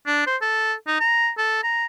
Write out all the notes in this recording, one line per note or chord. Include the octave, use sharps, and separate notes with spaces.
D4
C5
A4
D#4
A#5
A4
A#5